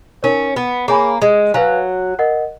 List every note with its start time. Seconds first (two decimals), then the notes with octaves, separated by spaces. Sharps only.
0.23 C#4 D#4 A#4 C#5
0.56 B3
0.88 A#3 G#4 C#5 G#5 B5
1.22 G#3
1.54 F#3 B4 F5 G#5
2.19 A#4 D#5 F#5